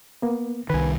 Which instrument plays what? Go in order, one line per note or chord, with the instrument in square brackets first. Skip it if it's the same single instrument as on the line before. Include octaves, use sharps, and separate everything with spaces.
[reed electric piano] A#3 B3
[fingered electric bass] C2 D#3 [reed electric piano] B4 G#5